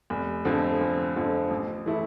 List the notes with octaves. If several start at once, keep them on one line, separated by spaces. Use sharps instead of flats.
F1
F2 D3 F3 C4
F1
F2 D3 F3 C4
A1
E3 A3 E4